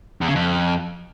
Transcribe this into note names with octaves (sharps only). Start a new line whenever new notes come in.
E2
C#3
F2